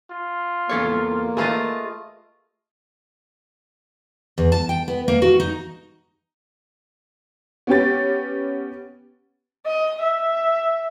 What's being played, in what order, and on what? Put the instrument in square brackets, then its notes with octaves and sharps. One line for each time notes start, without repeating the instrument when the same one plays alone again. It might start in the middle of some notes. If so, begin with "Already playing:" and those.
[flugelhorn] F4
[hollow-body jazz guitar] E2 A4 C#5 [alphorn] A#3
[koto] A3 F4 D#5 [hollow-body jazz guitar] G#4 B4
[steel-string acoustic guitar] E2
A5
G5
B3
A#3
F#4
D#4
[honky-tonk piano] B3 C#4 G4 A6
[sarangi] D#5
E5